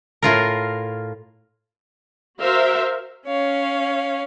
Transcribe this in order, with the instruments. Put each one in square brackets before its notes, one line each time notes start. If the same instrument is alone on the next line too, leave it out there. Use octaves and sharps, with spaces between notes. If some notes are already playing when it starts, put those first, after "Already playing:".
[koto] A2 F4 A#4
[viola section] F#4 A#4 C5 E5 F5
[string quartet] C#4 C#5 F5